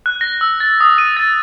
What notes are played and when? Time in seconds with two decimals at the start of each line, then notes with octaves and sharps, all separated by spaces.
0.06 F#6
0.21 A#6
0.41 E6
0.60 A6
0.80 D#6
0.98 D#7
1.17 A6